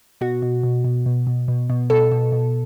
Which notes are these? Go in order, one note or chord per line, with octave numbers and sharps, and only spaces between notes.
B2 F#4
B2
B2
B2
B2
B2
B2
B2
B2 A4
B2
B2